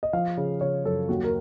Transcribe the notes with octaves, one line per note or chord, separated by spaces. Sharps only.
D#5
F3 F5
C#3
C#3 C#5
F#2 A4
D#2 F#4
A#4